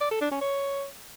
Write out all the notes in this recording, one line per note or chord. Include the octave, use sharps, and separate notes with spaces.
D5
A4
D4
C#4
C#5